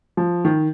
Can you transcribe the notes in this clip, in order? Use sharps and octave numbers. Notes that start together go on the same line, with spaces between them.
F3
D#3